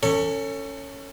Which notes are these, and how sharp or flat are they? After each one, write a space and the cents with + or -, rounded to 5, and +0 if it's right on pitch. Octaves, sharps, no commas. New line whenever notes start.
C#4 +0 A4 +35 C#5 +0